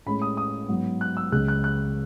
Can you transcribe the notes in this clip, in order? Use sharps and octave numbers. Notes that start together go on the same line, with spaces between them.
A2 G#3 C#4 B5
D#6
D#6
G#2 F#3 B3
F#6
E6
C#2 C#3 G#3 F#6
F#6
F#6